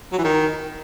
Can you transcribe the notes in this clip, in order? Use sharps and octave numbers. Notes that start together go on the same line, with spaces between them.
F#3
E3
D#3